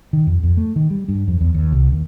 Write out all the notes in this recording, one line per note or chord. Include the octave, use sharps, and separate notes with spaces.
D#3
F2
F2
A3
D#3
G3
G2
F2
E2
D#2
C2
D#2